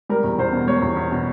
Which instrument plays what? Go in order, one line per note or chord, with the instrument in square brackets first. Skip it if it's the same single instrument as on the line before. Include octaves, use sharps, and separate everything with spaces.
[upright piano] G3 A#4
E2
E2 C5
B2
G3 C#5
E2
E2
B2